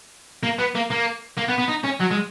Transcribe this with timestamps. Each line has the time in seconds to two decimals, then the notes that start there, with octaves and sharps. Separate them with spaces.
0.43 A#3
0.59 B3
0.75 A#3
0.90 A#3
1.37 A#3
1.48 B3
1.58 B3
1.68 D#4
1.84 C#4
2.00 F#3
2.11 G#3